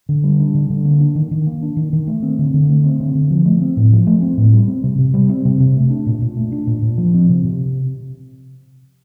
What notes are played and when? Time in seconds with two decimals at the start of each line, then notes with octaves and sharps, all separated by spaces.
0.09 D3
0.24 G3
0.40 D4
0.55 D3
0.70 D3
0.85 A#3
1.00 D4
1.15 D#3
1.31 D#3
1.46 A#3
1.62 D4
1.77 D#3
1.93 D#3
2.07 A3
2.23 C4
2.39 D3
2.54 D3
2.69 A3
2.84 C4
3.00 D3
3.15 D3
3.31 F3
3.46 A3
3.62 C4
3.77 A2
3.92 F3
4.07 A3
4.22 C4
4.38 A2
4.53 G3
4.68 C4
4.84 C3
4.99 C3
5.14 G3
5.29 C4
5.45 C3
5.60 C3
5.76 A3
5.91 D4
6.06 A#2
6.22 A#2
6.37 A3
6.52 D4
6.67 A#2
6.82 A#2
6.98 F3
7.14 C4
7.29 C3
7.45 C3